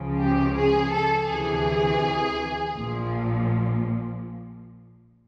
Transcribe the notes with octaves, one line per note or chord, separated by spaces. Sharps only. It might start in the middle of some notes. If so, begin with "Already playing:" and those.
Already playing: C#2 C#3 F3
G4
G#4
A4
D2 C3 E3 G#4
A#1 A#2 F3